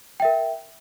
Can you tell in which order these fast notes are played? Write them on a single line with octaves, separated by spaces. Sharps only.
G5 E5 A#4